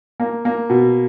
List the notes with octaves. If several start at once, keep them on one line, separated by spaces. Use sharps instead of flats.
A#3
A#3
B2